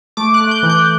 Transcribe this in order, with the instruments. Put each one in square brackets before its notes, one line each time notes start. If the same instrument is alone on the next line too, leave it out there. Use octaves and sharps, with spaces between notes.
[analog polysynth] A3 D6
F#6
A3
G6
E3
G6